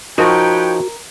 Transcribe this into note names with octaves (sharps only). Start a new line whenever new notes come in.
F3 D#4 F#4 A#4 B4 C#5 G5